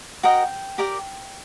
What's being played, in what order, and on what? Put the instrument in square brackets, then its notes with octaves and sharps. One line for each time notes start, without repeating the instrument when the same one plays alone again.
[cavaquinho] F#4 A#4 D#5 G5
G4 A#4 D5